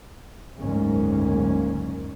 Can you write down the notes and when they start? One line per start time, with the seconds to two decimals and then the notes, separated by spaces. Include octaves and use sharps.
0.60 F#1 D2 G#2 A#3 C#4